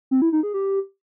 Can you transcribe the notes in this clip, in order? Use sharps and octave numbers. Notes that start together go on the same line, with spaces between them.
C4
E4
D#4
G#4
G4